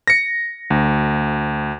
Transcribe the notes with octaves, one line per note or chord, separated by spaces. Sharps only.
A#6 C#7
D2